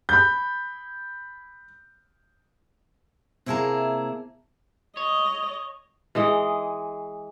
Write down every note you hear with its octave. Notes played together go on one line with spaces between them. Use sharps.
B5 G6
C3 A#3 E4 G#4 A5 A#5
C#5 D#5
E3 G#3 D#5